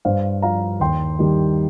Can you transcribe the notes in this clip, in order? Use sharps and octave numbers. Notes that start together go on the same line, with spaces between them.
G2 C5 F5
F3 F5 A#5
D#2 G5 C6
D#3 G3